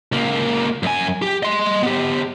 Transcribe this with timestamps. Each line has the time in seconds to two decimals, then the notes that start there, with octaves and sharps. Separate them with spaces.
0.12 C#2 A#3
0.83 F#2 G#5
1.22 G4
1.43 D#5 C6
1.83 B3 G4